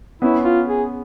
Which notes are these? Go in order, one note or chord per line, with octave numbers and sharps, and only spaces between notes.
B3 C#4 E4
F4
G#4